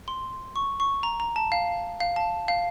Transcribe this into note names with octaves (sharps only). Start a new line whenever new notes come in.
C6
C#6
C#6
A#5
A#5
A5
F5
F5
A5
F5